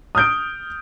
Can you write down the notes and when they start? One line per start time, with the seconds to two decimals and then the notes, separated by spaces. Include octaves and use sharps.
0.15 D#6 F6 G6 D7